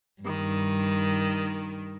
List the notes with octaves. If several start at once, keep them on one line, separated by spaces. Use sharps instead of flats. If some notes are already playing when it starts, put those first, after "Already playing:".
G2 D#3